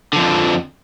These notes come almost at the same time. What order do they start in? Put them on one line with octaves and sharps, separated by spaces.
D3 F3 F2